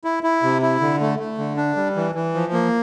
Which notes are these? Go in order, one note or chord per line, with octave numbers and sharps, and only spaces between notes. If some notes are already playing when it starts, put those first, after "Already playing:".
E4
E4
C3
E4
D3
A3
A3
D3
D4
G3
E3
E3
F3
A#3